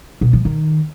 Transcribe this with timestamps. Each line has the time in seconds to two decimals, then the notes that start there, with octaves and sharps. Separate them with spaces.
0.21 B2
0.33 F3
0.45 D#3